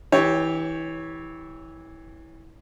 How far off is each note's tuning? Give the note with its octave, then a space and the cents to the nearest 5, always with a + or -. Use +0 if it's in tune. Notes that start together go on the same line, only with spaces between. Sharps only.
E3 -20 G4 +0 C#5 +0